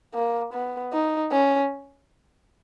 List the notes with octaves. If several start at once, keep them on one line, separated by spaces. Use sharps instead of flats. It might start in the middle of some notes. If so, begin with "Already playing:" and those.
A#3
B3
D#4
C#4